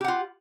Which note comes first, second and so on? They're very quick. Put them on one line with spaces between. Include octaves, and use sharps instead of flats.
G4 F#5 F4